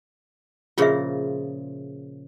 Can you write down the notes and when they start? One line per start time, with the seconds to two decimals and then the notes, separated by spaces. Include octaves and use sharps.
0.78 A#2 C#3 F3 F4 G#4 E5